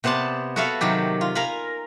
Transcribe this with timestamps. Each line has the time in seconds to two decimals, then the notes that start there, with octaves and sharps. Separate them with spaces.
0.04 C3 B3 C5 D5 A5
0.56 F#4 A4 B4 C#5 E5 F5
0.81 C3 D#3 F#3 G4
1.21 F4
1.35 A#4 F5 G#5 A#5 B5